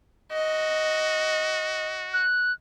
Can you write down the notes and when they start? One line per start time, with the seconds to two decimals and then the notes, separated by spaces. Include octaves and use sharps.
0.32 F#4 D#5
2.13 F#6